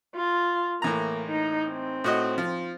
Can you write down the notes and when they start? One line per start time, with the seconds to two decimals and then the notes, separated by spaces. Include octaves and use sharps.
0.16 F4
0.82 A2 E3 A#3 A#5
1.28 D#4
1.69 C4
2.04 A2 F#4 D#5
2.38 F3